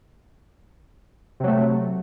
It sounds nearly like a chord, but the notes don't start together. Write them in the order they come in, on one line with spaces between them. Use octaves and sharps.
C3 F#3 A3